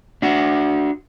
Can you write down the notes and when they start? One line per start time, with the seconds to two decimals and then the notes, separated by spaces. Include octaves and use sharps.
0.22 D4 F#4